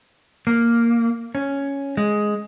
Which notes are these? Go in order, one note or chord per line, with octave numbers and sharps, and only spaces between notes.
A#3
C#4
G#3